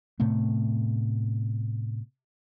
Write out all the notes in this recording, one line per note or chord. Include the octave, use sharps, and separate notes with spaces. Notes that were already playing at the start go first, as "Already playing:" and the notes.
A2 C3 A3 B3